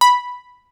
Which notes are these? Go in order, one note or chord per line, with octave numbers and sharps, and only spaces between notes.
B5